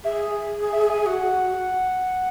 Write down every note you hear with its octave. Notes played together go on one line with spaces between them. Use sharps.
G#4 E5
E5
G#5
F#4 F#5